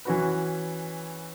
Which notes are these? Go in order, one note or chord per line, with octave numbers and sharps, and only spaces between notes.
E3 C#4 F#4 B4